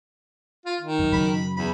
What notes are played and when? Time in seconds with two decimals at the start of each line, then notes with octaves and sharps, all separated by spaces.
0.66 F4
0.81 D#3
0.99 F#2
1.13 F#2 C#3 F#3 B5
1.57 E2 B5